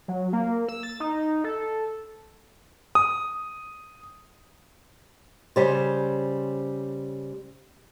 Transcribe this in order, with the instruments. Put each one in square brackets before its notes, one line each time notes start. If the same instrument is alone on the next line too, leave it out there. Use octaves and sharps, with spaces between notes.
[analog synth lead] F#3
A#3
E6
A6
D#4
A4
[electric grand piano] D#6
[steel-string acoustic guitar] C#3 G3 C5